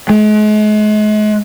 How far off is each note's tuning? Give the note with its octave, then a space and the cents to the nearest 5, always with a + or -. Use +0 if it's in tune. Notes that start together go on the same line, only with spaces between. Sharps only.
G#3 +40